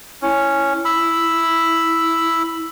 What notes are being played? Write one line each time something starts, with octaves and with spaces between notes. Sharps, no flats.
C#4 E4
B5 E6